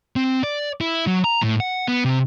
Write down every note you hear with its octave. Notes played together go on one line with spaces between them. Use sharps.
C4
D5
E4
F#3
A#5
A2
F#5
B3
C3